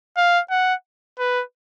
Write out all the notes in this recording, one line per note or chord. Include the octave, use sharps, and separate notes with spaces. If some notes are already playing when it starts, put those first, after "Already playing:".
F5
F#5
B4